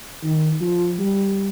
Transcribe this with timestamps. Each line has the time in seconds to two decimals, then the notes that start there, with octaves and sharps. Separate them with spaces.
0.23 D#3
0.61 F3
0.99 G3